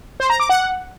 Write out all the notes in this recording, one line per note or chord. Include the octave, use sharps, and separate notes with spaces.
C5
A#5
D6
F#5